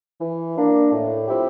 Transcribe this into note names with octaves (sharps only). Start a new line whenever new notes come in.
E3
A#3 D4
A2
F3 C4 E4 G4